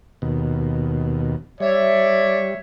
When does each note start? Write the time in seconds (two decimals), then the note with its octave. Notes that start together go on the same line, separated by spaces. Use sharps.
0.22 D#2 B2
1.60 G3 C#5 D5 E5